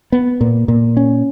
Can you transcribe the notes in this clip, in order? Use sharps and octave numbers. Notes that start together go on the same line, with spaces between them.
B3
A#2
A#2
C#4